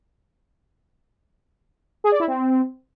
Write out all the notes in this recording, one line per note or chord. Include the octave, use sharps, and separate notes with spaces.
G#4
D5
E4
C4